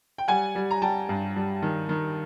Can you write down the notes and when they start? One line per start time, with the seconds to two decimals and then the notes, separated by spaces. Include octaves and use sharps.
0.18 G5
0.28 G3 F#5 G#5
0.55 G3
0.71 A#5
0.82 G3 G5 A5
1.09 G2
1.36 G3
1.62 D#3
1.89 D#3